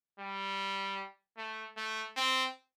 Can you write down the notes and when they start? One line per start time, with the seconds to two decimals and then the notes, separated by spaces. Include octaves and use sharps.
0.19 G3
1.38 A3
1.77 A3
2.17 C4